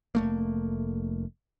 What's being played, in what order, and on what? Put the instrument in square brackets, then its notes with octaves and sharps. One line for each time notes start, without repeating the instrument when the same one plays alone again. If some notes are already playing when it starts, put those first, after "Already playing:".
[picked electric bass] F1 A3 A#3